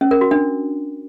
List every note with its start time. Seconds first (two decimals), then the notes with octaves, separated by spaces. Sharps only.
0.01 C#4
0.11 A#4
0.21 F#4
0.31 D4